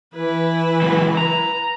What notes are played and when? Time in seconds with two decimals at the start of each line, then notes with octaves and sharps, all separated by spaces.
0.14 E3 E4 B4
0.82 C#2 F#3
1.17 A#5